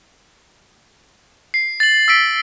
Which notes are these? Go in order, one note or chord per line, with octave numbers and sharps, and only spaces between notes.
C7
A6 F#7
E6 B6 D7